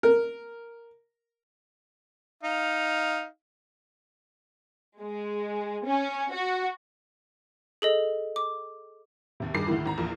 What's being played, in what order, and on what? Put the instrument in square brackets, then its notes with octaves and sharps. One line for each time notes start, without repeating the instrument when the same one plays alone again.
[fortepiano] A#4
[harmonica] D#4 F5
[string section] G#3
C#4
F#4
[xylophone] G#4 A4 D#5
D6
[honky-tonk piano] D#2 C3
G2 D#3 G#4 D6 C7
D2 A2 D#3 E3
G#1 A#5
A#1 E2 A#2